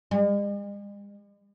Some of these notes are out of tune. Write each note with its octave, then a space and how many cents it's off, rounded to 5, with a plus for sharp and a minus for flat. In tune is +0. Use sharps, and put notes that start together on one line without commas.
G#3 -45